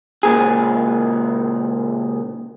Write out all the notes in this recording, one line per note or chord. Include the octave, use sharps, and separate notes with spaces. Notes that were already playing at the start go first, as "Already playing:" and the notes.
C#2 A#2 G#4